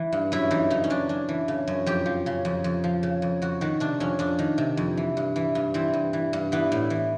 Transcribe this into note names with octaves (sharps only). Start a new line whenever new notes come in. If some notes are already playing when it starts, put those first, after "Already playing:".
Already playing: E3
G2
F#2 E4
E3 D#4
C#3 D#4
C#4
F#2 D4
F#2 D4
E3
C#3
F#2
F2 G4
F3
C#3
F2
F2
F3
C#3
F2
F2 F#4
D#3 F#4
C3 D4
F2 C#4
F2 D4
D#3
C3
F2
E3
G2
E3
G2
E3 C4
G2
E3
G2
E3 B3
A2
E3